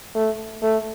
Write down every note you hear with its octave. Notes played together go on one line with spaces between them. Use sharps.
A3
A3